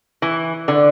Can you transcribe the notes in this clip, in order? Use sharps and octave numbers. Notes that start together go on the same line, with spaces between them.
E3
D3